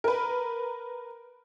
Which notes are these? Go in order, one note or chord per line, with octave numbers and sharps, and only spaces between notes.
A#4 B4